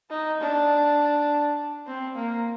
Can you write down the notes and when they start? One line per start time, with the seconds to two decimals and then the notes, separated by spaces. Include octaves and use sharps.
0.10 D#4
0.41 D4
1.87 C4
2.16 A#3